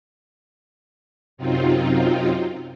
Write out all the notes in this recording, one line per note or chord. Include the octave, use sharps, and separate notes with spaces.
F#2 C3 F#3 C4 D#4 F4